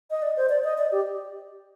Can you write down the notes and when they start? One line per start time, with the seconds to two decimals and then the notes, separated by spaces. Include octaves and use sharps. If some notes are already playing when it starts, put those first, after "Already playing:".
0.10 D#5
0.22 D5
0.37 C5
0.49 D5
0.64 D#5
0.78 D5
0.92 G4